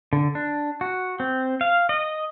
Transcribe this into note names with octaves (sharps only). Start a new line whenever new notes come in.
D3
D4
F#4
C4
F5
D#5